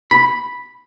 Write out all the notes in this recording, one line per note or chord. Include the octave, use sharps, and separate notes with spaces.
B5